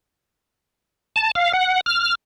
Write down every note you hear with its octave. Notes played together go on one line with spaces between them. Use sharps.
A5
F5
F#5
F6